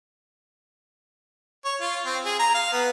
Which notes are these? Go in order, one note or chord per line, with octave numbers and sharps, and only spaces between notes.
C#5
F4
C4
G#4
A#5
F5
B3